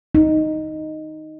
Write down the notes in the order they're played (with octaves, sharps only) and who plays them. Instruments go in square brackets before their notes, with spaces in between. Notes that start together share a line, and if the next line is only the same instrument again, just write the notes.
[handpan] D#4